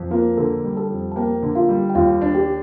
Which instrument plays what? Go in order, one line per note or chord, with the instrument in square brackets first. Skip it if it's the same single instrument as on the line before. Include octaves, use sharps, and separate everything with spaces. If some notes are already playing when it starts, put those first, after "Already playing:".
Already playing: [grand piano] F2
[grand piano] A#3 [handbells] F4 F5
[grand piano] D3 [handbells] A4 A5
[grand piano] G3
[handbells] A4 A5
[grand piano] F2
[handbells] A5
[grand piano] A#3 [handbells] G4 G5
[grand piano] D3
[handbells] F4 F5
[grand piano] G3
[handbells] G5
[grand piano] D#2 [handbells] F4 F5
[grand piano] D4
[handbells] G4 G5